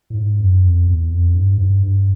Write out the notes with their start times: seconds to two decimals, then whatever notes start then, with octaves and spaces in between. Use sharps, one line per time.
0.10 A2
0.17 G#2
0.40 F#2
0.64 F2
0.87 E2
1.12 F2
1.35 G2
1.50 G#2
1.58 G2
1.83 G2